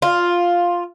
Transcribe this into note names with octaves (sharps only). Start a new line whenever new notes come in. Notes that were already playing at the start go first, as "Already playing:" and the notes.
F4